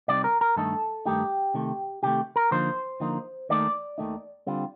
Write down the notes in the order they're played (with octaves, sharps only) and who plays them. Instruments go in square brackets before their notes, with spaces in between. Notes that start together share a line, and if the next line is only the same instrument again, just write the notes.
[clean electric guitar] C3 G3 C4 D#4 D5
A#4
A#4
G2 D#3 A3 D#4 A4
G2 D#3 A3 D#4 G4
C3 D#3 A3
C3 D#3 A3 G4
A#4
D3 F3 A#3 D#4 C5
D3 F3 A#3 D#4
D#2 D#3 A3 D#4 D5
D#2 D#3 A3 D#4
D3 G3 C4 F4